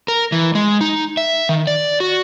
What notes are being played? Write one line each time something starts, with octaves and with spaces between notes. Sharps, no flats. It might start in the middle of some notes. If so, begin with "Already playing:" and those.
A#4
E3
G#3
D#4
E5
D#3
D5
F#4